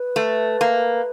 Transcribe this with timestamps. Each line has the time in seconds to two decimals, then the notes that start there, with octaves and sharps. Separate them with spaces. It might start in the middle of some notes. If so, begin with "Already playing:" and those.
Already playing: B4
0.16 A3
0.61 A#3